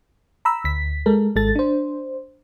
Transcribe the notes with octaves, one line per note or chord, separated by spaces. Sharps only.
A#5 B5 E6
D2 B6
G#3 A4 A#4
G#1 G#3 A4 A6
D4 C5